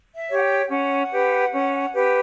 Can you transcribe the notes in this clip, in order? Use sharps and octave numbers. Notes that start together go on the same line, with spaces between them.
E5
G4 C#5
F#5
G5
G5
C#4 F#5
G4 B4
C#4
G4 B4